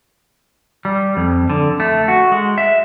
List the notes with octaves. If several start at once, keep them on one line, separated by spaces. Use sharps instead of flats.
G3
F2
D3
A3
F#4
G#3
E5